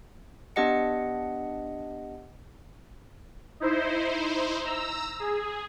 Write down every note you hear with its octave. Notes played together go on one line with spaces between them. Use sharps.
B3 D4 G4 D#5 F#5 C#7
D#4 E4 C5
A#5 E6
G#4